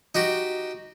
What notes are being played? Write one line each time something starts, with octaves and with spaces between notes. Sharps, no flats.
D#4 F#4 G4